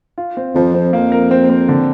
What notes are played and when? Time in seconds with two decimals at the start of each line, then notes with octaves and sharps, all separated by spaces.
0.18 F4
0.37 C4
0.55 F2 F3
0.74 C4
0.93 F2 A#3
1.12 A#4
1.31 C4
1.49 C4
1.68 D3